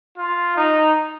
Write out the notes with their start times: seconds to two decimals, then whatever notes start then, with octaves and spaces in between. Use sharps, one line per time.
0.17 F4
0.56 D#4